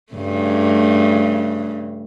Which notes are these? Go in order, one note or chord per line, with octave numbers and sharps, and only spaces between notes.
G2 C#3 A3